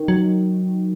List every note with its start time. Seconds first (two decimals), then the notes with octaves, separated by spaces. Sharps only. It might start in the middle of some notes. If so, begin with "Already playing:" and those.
Already playing: D#3
0.08 F#3